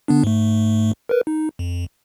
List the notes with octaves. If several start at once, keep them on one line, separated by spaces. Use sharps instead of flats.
D3 B3 D4
G#2 A3
A#4 B4
D#4
F2